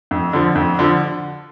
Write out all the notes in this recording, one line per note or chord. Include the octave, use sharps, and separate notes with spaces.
F2
D3 F3
F2
D3 F3